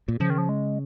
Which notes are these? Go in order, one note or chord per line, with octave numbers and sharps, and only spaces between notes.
A#2
C#3 F3
D#3
F3
G#3